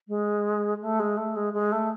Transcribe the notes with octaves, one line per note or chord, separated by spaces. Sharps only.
G#3
A3
G#3
A3
G#3
G#3
A3